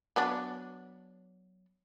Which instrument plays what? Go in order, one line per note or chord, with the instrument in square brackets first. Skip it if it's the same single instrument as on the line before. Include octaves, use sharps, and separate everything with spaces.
[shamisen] F#3 B3 D4